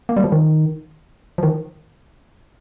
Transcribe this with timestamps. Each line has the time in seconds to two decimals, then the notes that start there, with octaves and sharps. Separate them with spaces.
0.09 A#3
0.17 G3
0.24 F3
0.32 D#3
1.38 F3
1.43 D#3